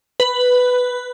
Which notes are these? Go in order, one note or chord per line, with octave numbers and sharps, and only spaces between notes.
B4